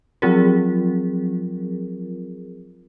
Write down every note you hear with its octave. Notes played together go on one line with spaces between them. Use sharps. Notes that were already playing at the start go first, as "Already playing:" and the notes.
F3 F#3 C4 F4 G#4 A#4